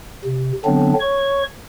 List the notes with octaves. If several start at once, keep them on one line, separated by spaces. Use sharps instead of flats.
C3
D3 F#3 B3 C4 D4
C#5 C#6